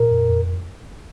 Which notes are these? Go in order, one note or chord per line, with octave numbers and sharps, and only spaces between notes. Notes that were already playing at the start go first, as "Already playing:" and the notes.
Already playing: A#2 A#4
F2
F2